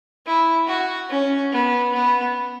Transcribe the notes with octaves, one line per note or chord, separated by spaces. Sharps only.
E4
F#4
C#4
B3
B3